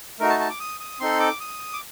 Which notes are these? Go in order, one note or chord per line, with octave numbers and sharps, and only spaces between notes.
A3 D#4 F#4 A#4
A5
A5
D6
D#6
D#6
C4 D#4 A4 C6
D6
D#6
D6